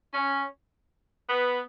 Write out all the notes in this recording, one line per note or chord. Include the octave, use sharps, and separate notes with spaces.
C#4
B3